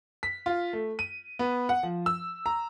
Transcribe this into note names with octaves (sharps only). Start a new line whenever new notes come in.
B6
F4
A3
D#7
B3
F#5
F3
E6
A#5